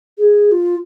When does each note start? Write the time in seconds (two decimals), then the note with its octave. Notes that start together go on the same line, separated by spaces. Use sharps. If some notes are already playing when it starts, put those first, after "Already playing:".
0.18 G#4
0.52 F4